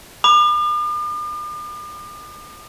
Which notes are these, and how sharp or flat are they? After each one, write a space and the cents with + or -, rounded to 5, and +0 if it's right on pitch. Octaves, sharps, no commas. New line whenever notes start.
B5 -5 D6 +45